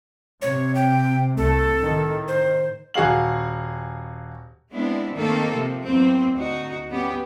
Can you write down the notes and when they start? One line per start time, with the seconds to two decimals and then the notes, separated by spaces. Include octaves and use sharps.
0.42 C3 C#5
0.75 G5
1.37 C2 A3 A4
1.79 A2 D#3
2.28 C5
2.94 D#1 F#4 G#4 F5 F#7
4.72 G#3 B3 C4 D4 E4
5.15 D#3 A3 A#3 C4 A4
5.55 C3 F3
5.86 E2 F#3 A#3 C4
6.35 D2 D#4 F#4
6.90 G3 B3 C#4 G4